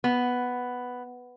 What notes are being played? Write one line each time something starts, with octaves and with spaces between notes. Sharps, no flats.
B3